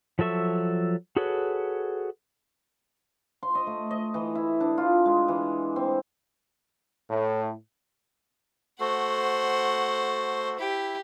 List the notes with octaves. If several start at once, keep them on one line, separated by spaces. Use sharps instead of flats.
F3 F#3 A4 E5 C#6
F#4 G#4 A4 B4 C#5
C6
D#5
A3
D#5
E3
E4
D4
F4
G#3
E3
C4
A2
A3 F#4 A4 C5 F#5
E4 G4 E5